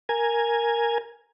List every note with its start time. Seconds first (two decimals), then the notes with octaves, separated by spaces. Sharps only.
0.09 A#4 G#5